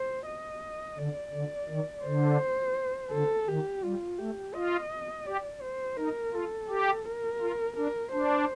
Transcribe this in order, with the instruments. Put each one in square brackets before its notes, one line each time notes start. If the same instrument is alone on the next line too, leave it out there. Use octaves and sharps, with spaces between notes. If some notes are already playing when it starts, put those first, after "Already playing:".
Already playing: [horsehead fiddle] C5
D#5
[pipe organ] D3 [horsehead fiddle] D5
[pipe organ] D3
D#3
[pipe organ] D3 [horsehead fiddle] C5
[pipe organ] D3 [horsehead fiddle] A4
[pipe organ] D#3 [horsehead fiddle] G4
[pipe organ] G3 [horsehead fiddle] F4
[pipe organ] A3 [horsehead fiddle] G4
[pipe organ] F4 [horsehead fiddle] D#5
[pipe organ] G4 [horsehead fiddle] D5
[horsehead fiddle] C5
[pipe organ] D#4 [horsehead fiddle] A#4
[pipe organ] F4 [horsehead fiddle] A4
[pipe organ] G4
[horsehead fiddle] A#4
[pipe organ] F4
[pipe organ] D4 [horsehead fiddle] A#4
[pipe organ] D4 [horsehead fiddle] C5